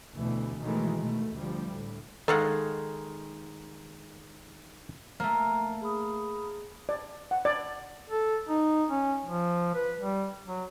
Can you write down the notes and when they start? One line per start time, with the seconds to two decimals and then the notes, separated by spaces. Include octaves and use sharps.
0.14 D2 B2 E3 A3
0.61 B2 D#3 E3 F#3 G#3 A3
0.96 B2 A3
1.37 D2 F3 G3
1.70 D2 A2
2.28 D#3 G#3 A4 F5 F#5
5.20 A3 A#3
5.81 G#4 B5 D#6
6.89 D5
7.31 F#5
7.45 D5
8.10 A4
8.49 D#4
8.90 C#4
9.25 F3
9.75 B4
10.00 G3
10.47 F#3